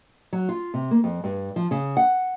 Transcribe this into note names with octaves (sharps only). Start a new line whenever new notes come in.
F#3
F4
C3
A#3
F2
G2
F3
C#3
F#5